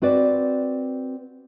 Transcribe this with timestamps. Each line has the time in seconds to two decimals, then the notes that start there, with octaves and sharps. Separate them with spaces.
0.02 C4 F#4 B4 D5